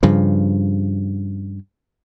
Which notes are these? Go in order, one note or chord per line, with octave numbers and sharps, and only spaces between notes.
G2 C#3 F3